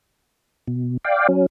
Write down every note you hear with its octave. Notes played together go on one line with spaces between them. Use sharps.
B2
D5 F5 G5
F#3 C#4